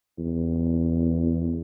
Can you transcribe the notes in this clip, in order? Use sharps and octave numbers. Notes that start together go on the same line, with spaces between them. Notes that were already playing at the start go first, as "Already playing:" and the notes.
E2